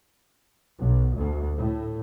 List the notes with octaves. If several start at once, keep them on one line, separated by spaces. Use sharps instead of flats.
B1
D2
A2